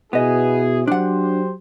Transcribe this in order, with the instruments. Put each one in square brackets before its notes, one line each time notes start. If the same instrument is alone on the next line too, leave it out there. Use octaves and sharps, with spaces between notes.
[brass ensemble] B2 E4 G#4 [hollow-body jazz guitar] B3 D#5
[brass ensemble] F#3 G4 C5 [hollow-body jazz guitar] D4 F#5